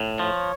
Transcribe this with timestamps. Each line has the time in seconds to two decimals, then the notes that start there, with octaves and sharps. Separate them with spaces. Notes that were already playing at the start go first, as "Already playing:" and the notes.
Already playing: A2
0.19 F3 C#5